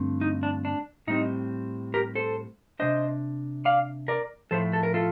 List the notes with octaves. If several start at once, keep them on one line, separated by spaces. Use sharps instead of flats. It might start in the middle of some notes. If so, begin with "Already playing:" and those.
Already playing: G2 D3 A3 C4
D#4
D4
D4
A2 G3 C4 D#4
G4 A#4
A4 C5
C3 G3 D4 C5 D#5
D5 F5
A#4 D5
A2 F3 A3 A4 C5
A4
A#4
F4 A4